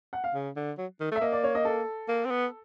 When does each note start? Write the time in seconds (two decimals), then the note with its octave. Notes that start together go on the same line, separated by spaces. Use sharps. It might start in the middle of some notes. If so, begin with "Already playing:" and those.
0.13 F#5
0.24 F5
0.34 C#3
0.56 D3
0.78 F#3
1.00 D#3
1.11 A3
1.16 E5
1.21 A#3 D#5
1.32 D5
1.44 C#5
1.55 D#5
1.65 A4
2.08 A#3
2.26 C4
2.31 B3